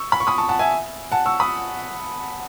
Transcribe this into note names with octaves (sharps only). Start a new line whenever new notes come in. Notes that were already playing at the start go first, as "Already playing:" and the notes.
Already playing: C#6 E6
B5
C#6
B5 D#6
A5 C#6
F#5 A5
E5 G#5
F#5 A5
C#6 E6
B5 D#6